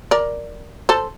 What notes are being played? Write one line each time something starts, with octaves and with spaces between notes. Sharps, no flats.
A#4 D5
A4 C5